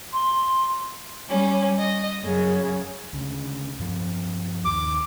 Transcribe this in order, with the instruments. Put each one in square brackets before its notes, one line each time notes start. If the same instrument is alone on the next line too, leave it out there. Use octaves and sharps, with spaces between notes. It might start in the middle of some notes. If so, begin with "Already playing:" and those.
[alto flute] C6
[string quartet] G3 C#4
D#5
F#2 C#3
[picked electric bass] D2 C#3
G2 F3 C4
[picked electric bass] D#2 [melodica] D6